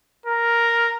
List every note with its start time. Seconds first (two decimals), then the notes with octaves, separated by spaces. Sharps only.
0.26 A#4